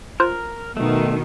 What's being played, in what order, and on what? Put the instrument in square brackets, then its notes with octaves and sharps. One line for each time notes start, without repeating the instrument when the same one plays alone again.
[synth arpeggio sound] F4 C5 F#6 [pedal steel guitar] A#4
[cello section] B2 D#3 [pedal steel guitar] A3